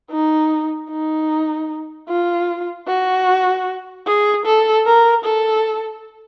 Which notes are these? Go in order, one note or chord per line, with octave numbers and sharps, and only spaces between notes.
D#4
D#4
F4
F#4
G#4
A4
A#4
A4